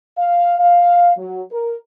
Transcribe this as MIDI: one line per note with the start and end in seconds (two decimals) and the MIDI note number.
0.18 0.59 77
0.59 1.12 77
1.18 1.43 54
1.52 1.76 70